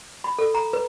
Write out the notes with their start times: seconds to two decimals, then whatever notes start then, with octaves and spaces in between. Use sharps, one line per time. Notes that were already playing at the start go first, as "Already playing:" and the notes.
0.24 B5
0.39 A4
0.55 A#5
0.73 B4